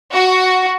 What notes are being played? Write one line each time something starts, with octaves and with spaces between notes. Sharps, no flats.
F#4